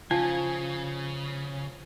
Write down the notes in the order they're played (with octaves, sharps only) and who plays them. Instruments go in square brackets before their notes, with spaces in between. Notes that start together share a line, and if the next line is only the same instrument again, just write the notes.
[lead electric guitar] C#3 [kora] F3 [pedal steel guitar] G#5